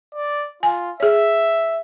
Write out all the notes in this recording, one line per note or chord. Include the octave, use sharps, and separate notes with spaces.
D5
F4 G#5
G#4 C#5 E5